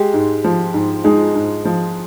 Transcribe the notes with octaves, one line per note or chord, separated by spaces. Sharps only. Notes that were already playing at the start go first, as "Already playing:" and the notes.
Already playing: G#3 G4
G#2
F3
G#2
G#3 D#4
G#2
F3